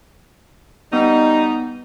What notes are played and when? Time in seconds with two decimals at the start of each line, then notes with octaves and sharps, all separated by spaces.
0.93 G3 B3 D#4